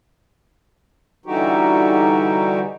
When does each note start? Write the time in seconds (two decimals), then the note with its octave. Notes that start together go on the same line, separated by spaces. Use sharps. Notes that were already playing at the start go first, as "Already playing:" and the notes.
1.26 D3 E3 G3 D#4 F#4 G4